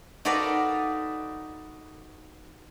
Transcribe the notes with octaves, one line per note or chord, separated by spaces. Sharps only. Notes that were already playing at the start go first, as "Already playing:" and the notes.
D#4 F#4 A4 B4 D5 F5